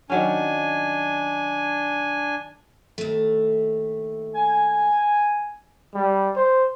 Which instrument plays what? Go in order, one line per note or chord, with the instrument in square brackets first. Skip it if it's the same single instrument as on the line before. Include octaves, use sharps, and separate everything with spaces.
[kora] D#3 F#3 C#4 [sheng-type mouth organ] D4 G#5
[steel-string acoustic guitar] D#2 A3
[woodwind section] G#5
[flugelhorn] G3
C5